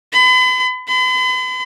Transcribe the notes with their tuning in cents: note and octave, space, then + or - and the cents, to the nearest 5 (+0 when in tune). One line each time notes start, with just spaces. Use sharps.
B5 +40
B5 +45